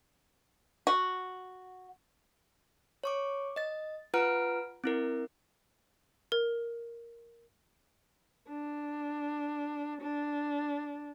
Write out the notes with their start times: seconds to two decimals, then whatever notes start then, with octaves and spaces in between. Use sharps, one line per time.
0.87 F#4
3.04 C#5 C#6 D6
3.56 D#5 A6
4.14 F4 B4 F#5 A#5 F6 D7
4.84 C4 E4 A#4
6.32 A#4
8.49 D4
10.02 D4